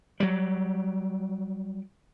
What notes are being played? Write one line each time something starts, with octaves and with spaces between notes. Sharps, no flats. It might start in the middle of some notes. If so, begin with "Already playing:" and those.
F#3 G3